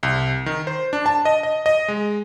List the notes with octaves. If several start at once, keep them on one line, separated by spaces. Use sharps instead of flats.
C2
D#3
C5
D4
A5
D#5
D#5
D#5
G#3